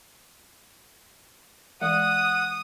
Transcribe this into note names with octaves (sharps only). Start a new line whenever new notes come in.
E3 G#3 F#5 D#6